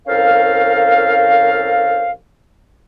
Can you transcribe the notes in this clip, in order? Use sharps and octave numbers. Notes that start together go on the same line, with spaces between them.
C2 C#4 A4 A#4 C5 F5